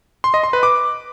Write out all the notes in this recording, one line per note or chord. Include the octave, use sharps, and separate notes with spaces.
C6
D#5
C6
B4
D6